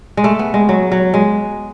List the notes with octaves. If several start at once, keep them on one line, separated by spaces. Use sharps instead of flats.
G#3
A3
B3
G#3
F#3
F#3
G#3